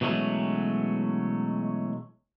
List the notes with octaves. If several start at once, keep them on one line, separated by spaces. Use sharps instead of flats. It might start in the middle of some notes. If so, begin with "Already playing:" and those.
B2 E3 F#3 G#3 A3 C#4